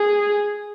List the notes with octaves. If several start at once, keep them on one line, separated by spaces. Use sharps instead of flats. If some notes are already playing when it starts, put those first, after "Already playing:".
Already playing: G#4